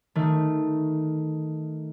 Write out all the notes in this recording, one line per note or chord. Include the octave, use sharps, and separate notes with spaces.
D#3 A3